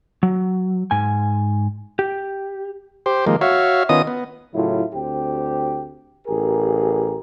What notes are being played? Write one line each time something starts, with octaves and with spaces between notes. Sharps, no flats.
F#3
G#2 G#5
G4
G4 C5
D#3 F3 G#3 A#3
F#4 C#5 E5 F5
D#3 B3 C#4 F4 D#5 D#6
B3
A2 C#3 F#3 E4 F4
D2 C4 G4
A1 G4 G#4 A#4